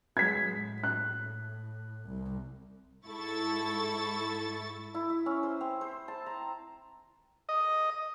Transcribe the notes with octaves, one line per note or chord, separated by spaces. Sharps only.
F#3 G#3 G#6 B6
A2
F#6
C2
G#2 E4 A4 C#6 A6
E4
E5
C#4
C5
C4
C5
A5
A#5
D#5